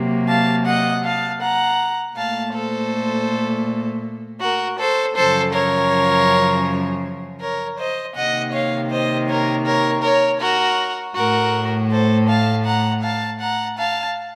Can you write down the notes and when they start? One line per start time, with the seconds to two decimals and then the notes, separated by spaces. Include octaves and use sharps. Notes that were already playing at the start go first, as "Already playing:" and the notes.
Already playing: C3 F#3 A#3
0.28 F5 A5
0.66 D#5 F#5
1.04 F5 A5
1.41 F#5 A#5
2.16 A#2 A3 F5 A5
2.54 A4 C5
4.41 F#4 A#4
4.79 A4 C5
5.16 F#2 C#3 F3 A4 C5
5.54 A#4 C#5
7.40 A#4 C#5
7.78 C5 D#5
8.15 C3 D#3 A#3 D#5 F#5
8.53 C#5 F5
8.91 C5 D#5
9.28 A#4 C#5
9.66 A#4 C#5
10.03 A#4 C#5
10.41 F#4 A#4
11.15 A2 A3 F#4 A#4
11.91 A4 C5
12.28 F5 A5
12.66 F#5 A#5
13.03 F5 A5
13.40 F#5 A#5
13.78 F5 A5